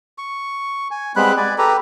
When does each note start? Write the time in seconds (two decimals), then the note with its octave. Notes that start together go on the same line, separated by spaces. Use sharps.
0.18 C#6
0.91 G#5
1.16 G3 G#3 B3 C4 B5 F#6
1.37 D5 G#5
1.58 G4 A4 B4 A#5